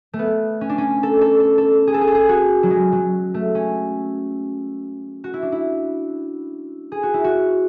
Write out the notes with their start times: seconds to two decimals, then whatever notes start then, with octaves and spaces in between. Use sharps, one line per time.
0.13 A3
0.19 B3
0.61 C#4
0.69 D4
0.78 C#4
1.03 A4
1.21 A4
1.40 A4
1.58 A4
1.87 G#4
1.94 A4
2.01 G#4
2.08 A4
2.15 G#4
2.29 F#4
2.63 F#3
2.70 G#3
2.92 F#3
3.34 A3
3.55 C#4
5.24 F#4
5.34 E4
5.42 D4
5.52 E4
6.92 G#4
7.03 F#4
7.14 E4
7.24 F#4